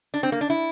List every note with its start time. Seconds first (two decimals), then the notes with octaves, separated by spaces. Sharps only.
0.14 D4
0.23 C4
0.32 A#3
0.41 D4
0.50 E4